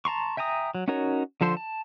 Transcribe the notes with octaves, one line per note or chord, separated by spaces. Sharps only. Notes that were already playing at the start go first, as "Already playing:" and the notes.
A5 A#5 C6 C#6
E5 G5 G#5 A#5 D#6
F#3
C#4 D#4 F#4 A#4 C#5
D3 F3 A4 C5 C6
A5